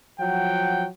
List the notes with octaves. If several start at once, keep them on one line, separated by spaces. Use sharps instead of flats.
F3 F#3 F#5 G5